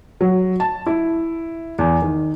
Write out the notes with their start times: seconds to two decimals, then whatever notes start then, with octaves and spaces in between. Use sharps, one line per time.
0.21 F#3
0.60 A5
0.87 E4
1.79 E2
2.02 D#3